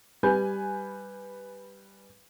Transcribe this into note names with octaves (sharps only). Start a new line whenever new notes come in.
G3 B4 G#5 G6